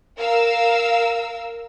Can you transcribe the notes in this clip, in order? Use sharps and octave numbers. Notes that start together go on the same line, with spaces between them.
A#4 F5 E6